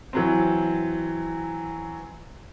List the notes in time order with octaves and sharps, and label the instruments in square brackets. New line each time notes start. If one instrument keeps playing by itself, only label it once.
[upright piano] E3 F#3 C4